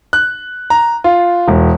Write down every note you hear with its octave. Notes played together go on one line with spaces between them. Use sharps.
F#6
A#5
F4
E1